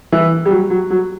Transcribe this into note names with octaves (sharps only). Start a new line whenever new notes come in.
E3
G3
F#3
F#3
F#3